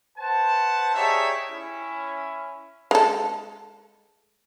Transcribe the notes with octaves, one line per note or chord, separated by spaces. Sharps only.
B4 C5 F#5 A5
D#4 G4 G#4 C#5 D5 E5
C#4 E4
G#3 A4